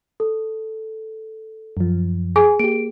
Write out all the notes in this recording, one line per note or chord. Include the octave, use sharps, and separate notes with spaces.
A4
F#2 F3
G#4 G#5
A#3 G4 D7